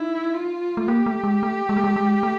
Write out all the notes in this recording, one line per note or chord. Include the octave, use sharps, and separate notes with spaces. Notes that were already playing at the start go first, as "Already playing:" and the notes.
Already playing: D#4 E4
F4
A3
A#3 G4
A3
G#3
A3
G#3
A3
G#3
G#3
A3